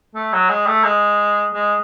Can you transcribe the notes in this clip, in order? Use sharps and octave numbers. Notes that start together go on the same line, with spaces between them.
A3
F#3
G#3
A3
G#3
G#3